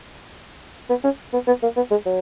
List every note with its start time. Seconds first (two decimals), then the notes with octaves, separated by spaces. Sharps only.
0.89 B3
1.04 C#4
1.33 B3
1.47 B3
1.62 A#3
1.76 B3
1.91 G#3
2.06 F#3